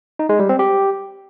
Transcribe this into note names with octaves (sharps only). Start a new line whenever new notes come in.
D#4
G#3
G3
C4
G4